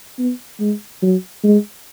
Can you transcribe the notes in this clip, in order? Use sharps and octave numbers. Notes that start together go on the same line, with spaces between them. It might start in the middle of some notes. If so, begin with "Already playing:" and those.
B3
G#3
F#3
G#3